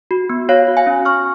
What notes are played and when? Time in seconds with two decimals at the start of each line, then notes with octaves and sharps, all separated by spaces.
0.11 F#4
0.29 B3
0.49 F#4 C#5 F5
0.68 F#4
0.77 F5 G#5
0.87 C#4
1.05 F#4 C#6 F6